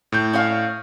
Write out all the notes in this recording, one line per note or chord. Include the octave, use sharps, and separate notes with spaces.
A2 G6
C#4 C#5 F5